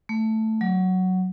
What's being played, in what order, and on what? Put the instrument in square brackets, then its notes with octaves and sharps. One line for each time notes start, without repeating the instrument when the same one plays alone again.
[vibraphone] A3
F#3